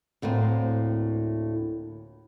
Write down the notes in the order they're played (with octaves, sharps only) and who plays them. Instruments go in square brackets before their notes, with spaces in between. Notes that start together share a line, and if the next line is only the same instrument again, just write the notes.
[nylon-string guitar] D2 A2 A#3 C4